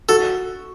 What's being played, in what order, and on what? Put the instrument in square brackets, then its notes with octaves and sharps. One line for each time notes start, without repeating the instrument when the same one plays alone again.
[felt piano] F#4 [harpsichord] A4